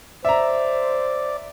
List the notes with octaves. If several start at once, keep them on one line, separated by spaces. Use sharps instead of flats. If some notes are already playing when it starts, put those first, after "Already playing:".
C5 D5 E5 A#5